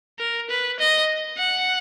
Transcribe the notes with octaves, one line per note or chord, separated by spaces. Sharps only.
A#4
B4
D#5
F#5